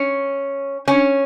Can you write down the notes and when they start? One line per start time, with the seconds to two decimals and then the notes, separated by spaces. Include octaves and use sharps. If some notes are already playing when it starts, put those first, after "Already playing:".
Already playing: C#4
0.88 C#4